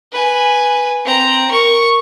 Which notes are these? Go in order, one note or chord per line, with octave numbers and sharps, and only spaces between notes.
B4 G#5
C4 A#5
A#4 C#6